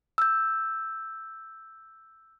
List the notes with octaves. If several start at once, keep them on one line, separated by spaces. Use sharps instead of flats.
E6 G6